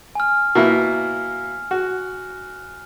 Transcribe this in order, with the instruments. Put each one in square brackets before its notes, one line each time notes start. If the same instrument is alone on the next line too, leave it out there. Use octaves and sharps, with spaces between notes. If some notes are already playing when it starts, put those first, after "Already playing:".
[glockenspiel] G#5 F6
[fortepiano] B2 A#3 E4
F#4